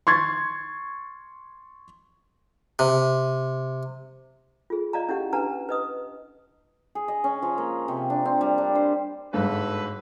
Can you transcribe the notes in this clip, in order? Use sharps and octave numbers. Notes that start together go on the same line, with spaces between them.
C6 C#6 G#6 A6
C3
F4 G#4
D5 D#5 F5 A5 A#5
C#4 E4 G4 F#5
D4 B4 F#5 A5 A#5
B4 D#5 D#6
G#4
D#5
C#4
F3
A#3
C3
D4
C4
G3
D4
C5
G1 G#2 F#4 A4 B4